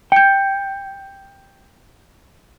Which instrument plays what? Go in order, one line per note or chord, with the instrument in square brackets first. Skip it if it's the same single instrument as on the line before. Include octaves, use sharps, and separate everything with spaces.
[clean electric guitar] G5 [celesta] G6 C#7